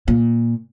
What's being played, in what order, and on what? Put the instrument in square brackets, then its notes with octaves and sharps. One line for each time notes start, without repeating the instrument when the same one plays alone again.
[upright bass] A#2